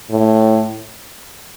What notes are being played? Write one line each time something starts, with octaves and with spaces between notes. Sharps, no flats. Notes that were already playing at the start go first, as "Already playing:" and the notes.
A2